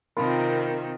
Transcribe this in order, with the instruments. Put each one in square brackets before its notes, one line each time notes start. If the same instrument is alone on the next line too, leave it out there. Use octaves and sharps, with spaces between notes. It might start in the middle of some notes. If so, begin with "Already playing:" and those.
[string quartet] C3 D#3 C4 [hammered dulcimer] F4 A#5 [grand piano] A#4 B5